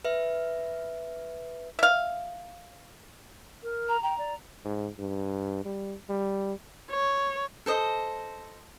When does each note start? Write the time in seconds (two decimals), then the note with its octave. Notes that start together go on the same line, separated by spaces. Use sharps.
0.05 B4 E5
1.79 E5 F5
3.63 A#4
3.88 A#5
4.03 G5 A#5
4.18 D5
4.64 G#2
4.99 G2
5.65 G3
6.09 G3
6.91 C#5
7.66 A4 C5 D#5